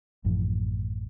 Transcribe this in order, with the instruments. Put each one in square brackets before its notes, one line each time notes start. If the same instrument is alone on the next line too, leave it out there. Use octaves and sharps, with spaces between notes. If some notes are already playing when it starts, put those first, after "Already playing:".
[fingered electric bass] A1 F#2 A2 F3